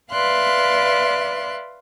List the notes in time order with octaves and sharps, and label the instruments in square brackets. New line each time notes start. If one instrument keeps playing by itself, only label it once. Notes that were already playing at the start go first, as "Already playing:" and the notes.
[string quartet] B4 D5 E5 F5 C6 F#6